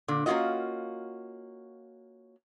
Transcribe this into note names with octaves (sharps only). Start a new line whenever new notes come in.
A#2 D3
A#3 C#4 D4 F4 F#4 D#5